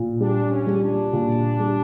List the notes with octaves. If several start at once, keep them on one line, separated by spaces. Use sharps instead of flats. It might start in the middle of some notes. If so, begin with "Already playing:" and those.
Already playing: A#2
G3 D4
C#4
G3
D4
A#2
G3